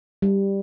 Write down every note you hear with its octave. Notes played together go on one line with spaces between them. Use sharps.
G3